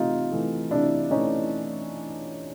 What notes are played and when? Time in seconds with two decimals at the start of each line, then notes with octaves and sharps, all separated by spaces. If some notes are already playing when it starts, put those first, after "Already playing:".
Already playing: C3 E3 A3 D#4 F4
0.31 E3 A3
0.71 C3 D4 E4
1.11 E3 A3 C#4 D#4